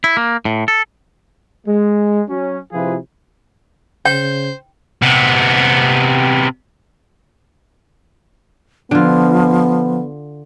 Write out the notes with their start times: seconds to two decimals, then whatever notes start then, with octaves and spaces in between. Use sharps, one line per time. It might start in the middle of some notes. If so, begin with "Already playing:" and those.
0.04 E4
0.17 A#3
0.45 A2
0.68 A4
1.67 G#3
2.29 F#3 C#4
2.73 C3 F3 E4 F4 G#4 B4
4.05 C#3 C5 G5 G6
5.02 C3 B3
8.91 D3 F3 B3 F4